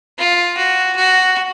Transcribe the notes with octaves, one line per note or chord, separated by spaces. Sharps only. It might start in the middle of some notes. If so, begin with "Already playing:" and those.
F4
F#4
F#4